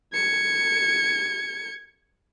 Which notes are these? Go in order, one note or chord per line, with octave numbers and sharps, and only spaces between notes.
G#6 C#7